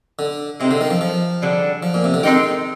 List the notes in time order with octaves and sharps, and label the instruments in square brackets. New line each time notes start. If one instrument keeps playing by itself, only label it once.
[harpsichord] D3
[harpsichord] C3 [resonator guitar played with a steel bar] G#3 C4 D#4
[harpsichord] D3
D#3
F3
F3
[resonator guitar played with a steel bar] D3 G3 D4 G#4
[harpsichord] F3
A#2
C3
D3
[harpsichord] D#3 [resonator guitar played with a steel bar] G#3 C4 D#4 G4